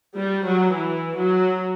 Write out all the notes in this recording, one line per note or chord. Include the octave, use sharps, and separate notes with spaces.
G3
F#3
E3
F#3